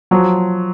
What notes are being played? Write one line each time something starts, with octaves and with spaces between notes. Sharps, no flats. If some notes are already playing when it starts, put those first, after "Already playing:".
F3 F#3